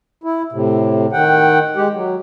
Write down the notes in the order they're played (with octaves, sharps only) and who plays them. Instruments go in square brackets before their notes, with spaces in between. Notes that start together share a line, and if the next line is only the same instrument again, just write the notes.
[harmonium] E4
A2 C3
D#3 F#5 G5
G#3 G4
F#3